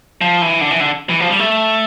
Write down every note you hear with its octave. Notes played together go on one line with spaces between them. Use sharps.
F3
E3
D3
E3
D3
E3
F3
G3
A3